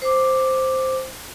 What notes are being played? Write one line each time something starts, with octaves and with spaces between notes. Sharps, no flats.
C5 D6